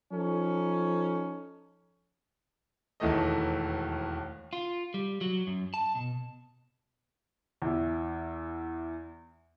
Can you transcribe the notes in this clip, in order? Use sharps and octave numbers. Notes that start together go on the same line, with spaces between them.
F3 C#4 D#4 A4
E1 D#2 E3 A3 A4 D#5
F4
G3
F#3
F#2
A5
B2
E2 E4